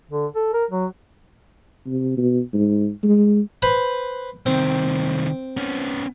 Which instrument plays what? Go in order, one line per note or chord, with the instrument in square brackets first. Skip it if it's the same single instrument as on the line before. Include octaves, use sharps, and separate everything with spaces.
[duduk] D3
A4
A#4
F#3
[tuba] C3
B2
G#2
G#3
[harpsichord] B4 C5 B5
[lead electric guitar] C2 D#3 [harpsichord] C4
[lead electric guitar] B3 C#4